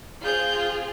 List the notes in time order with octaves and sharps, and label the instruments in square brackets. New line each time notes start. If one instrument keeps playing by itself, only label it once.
[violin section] C4 F4 G#4 G6